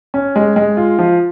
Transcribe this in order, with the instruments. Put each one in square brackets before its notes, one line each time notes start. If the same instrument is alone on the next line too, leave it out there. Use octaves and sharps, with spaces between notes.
[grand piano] C#4
G#3
G#3
F4
F3